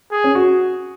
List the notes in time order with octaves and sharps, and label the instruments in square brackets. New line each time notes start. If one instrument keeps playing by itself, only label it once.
[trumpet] G#4
[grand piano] C#4
F#4